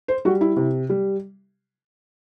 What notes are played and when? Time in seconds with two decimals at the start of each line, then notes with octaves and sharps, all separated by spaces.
0.08 C5
0.25 G3 F#4
0.41 E4
0.57 C3
0.89 G3